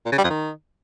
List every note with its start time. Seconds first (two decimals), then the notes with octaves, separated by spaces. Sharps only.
0.06 A#2
0.12 C#3
0.18 G3
0.24 F2
0.30 D#3